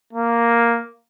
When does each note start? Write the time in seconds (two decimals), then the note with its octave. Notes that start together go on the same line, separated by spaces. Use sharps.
0.13 A#3